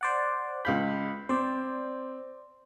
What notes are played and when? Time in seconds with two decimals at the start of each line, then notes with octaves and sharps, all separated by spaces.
0.01 C5 D5 F#5
0.65 C#2 F5 B5 G6
1.29 C4 C5 D5